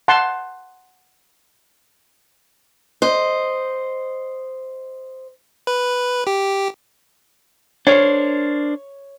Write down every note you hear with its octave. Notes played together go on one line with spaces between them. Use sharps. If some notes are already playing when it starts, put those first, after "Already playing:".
F#5 A5 C6
C5 D#5
B4
G4
D4 A#4 C5 C#5